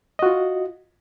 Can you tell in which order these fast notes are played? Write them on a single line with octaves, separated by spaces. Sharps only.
D#5 F#4 F4